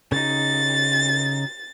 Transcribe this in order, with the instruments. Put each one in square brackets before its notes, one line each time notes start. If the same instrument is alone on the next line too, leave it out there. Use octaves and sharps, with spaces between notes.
[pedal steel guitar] C#3 D#4 [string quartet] A6